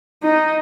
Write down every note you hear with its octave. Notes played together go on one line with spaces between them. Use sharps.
D#4